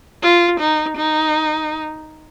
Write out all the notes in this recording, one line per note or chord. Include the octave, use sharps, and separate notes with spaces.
F4
D#4
D#4